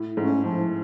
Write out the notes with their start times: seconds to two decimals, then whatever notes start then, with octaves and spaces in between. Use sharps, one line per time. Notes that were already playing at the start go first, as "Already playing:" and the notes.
Already playing: A2
0.17 G#2 A3 C#4
0.43 A2 F3